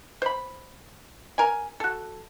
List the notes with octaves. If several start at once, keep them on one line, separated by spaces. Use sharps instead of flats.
C5 B5
A#4 G#5
F#4 A4